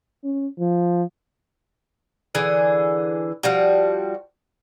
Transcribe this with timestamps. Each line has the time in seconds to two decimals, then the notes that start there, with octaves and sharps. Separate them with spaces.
0.24 C#4
0.59 F3
2.35 D3 E3 G#4
3.43 F3 G3 F#4